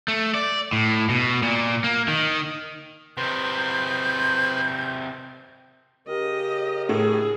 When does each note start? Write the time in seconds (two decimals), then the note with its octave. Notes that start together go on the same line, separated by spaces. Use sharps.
0.08 A3
0.35 D5
0.73 A2
1.09 B2
1.43 A#2
1.84 A#3
2.08 D#3
3.17 C3 D#3 B4 C5 G6
6.07 C#3 G4 A#4 D#5
6.89 A2 G#4